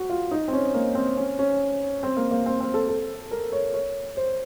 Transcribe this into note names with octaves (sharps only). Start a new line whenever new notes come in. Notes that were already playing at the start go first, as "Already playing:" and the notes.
Already playing: F#4
F4
D#4
C4
C#4
A#3
C4
C#4
C#4
C4
A#3
A#3
C4
C4
A4
A4
A#4
C#5
C#5
C5